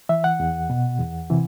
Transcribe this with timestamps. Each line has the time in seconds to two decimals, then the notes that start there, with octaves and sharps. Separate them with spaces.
0.09 E3 E5
0.24 F#5
0.40 E2
0.70 B2
0.99 E2
1.30 C3 E3